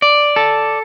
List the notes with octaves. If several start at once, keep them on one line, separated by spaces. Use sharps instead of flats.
D5
A4